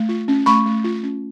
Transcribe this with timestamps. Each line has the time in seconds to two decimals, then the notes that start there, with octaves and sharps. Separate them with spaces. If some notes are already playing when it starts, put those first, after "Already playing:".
Already playing: A3
0.09 F4
0.28 C#4
0.46 A3 B5 C#6
0.66 A3
0.84 F4
1.03 C#4